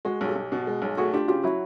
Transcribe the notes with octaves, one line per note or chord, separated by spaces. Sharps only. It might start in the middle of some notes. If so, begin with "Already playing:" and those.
G#3 F#4 G#4
B1
G4 A4
B1
B2
G#3
B1
A3 F#4 G#4
D4 F4 G4
C#3 F4 G4
F#3 E4 F#4